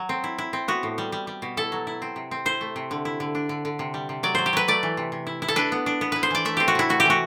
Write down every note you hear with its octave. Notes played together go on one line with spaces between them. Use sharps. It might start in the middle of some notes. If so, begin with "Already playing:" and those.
Already playing: F#3
C4
E4
E4
C4
B3 F#4
A2
G3
G3
G3
B2
E4 A4
F#3
E4
C4
C3
C4
E4 C5
A3
C3
D3
E4
D3
D4
D3
D3
C3
G3
C3
F#3 D5
F#3 C5
G4
F#3 B4
A3 D5
E3
C3
C3
E4
E4
A4
D4 B4
B3
D4
B3
E4 B4
C5
E3 D5
A3 E5
C4 G4
F#4
C3 E4
A3 F#4
G4
E3 F#4